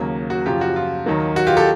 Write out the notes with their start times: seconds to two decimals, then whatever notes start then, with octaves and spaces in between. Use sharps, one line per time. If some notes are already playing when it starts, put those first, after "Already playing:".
Already playing: D#2 C#3 F#3 A#3
0.30 F#4
0.46 F#2 C#3 F3 F4 G4
0.61 F#4
0.76 F4
1.06 D#2 D#3 F#3 A#3
1.36 F#4
1.47 F4 G4
1.57 G4 A4